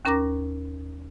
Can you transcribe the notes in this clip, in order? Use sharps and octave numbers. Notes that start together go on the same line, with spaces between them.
D#2 C#4 A#4 A#5 D6 A#6